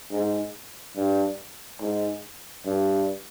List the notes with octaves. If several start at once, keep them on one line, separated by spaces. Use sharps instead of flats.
G#2
G2
G#2
G2